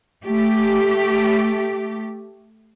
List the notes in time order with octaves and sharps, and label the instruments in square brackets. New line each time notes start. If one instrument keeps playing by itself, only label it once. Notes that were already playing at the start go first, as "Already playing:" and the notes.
[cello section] A3 G4